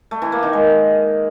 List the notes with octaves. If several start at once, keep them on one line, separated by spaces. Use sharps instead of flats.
A3
E3
A#3
D#3
G#3